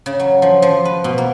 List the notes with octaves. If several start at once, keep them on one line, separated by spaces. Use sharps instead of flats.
C#3
F#3
F3
F3
B4
B2
A#3